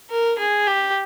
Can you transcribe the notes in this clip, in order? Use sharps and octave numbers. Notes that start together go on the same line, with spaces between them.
A#4
G#4
G4